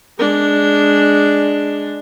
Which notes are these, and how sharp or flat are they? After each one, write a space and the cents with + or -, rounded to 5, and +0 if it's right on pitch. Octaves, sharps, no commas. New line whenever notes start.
G#3 +0 D4 +0